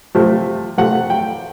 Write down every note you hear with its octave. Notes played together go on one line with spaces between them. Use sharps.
C3 F3 A3
C3 F3 A3 F#5
G5